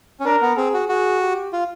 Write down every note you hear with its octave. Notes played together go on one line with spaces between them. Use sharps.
C#4
D4 A#4
B3
C4 G#4
F#4
F#4 G#4
G4
F4